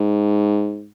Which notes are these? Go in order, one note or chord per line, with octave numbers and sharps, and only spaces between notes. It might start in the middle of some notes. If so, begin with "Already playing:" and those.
Already playing: G#2